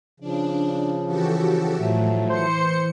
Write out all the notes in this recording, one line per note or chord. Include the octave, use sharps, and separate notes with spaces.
C#3 F3 D4
E3 F#4 G4 A4
A2 F3 F#3 A3
E3 C5 C#7